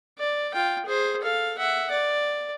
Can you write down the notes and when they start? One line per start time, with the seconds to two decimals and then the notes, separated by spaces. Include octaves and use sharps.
0.18 D5
0.54 F4 G5
0.85 G#4 C5
1.21 A4 F5
1.58 E5 F#5
1.91 D5